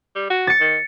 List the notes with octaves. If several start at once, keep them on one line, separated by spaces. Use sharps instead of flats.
G3
F#4
A6 C#7
D#3